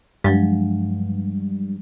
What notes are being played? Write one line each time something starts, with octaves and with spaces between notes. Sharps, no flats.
G2 F3 F#3 G#3